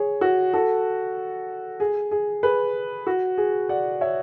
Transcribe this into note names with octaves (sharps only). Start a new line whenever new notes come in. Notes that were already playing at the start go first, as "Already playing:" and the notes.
Already playing: G#4 C#5
F#4
F#4 A4
G#4
G#4
G#4 B4
F#4
G#4
D5 F#5
C#5 E5